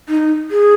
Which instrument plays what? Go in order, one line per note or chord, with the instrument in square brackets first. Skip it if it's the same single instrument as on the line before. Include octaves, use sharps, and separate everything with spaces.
[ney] D#4
G#4